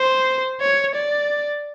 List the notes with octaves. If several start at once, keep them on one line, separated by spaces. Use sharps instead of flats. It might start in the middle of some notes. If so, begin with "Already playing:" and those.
Already playing: C5
C#5
D5